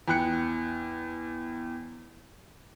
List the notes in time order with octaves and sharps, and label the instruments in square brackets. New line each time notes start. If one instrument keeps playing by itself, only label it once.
[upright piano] E2 G5 F#6 C#7